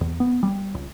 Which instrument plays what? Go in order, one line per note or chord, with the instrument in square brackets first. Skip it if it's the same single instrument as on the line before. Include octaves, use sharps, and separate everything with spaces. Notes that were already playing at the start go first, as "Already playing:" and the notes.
[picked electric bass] E2
B3
G3
C#2